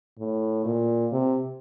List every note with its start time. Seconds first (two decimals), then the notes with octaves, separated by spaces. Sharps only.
0.18 A2
0.65 A#2
1.12 C3